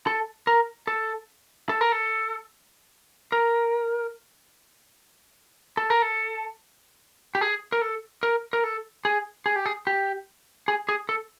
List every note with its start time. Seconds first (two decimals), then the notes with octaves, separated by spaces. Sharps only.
0.07 A4
0.47 A#4
0.87 A4
1.69 A4
1.81 A#4
1.92 A4
3.32 A#4
5.77 A4
5.90 A#4
6.02 A4
7.35 G4
7.41 G#4
7.72 A#4
7.82 A4
8.23 A#4
8.53 A#4
8.64 A4
9.05 G#4
9.46 G#4
9.56 G4
9.66 G#4
9.87 G4
10.68 G#4
10.89 G#4
11.09 A4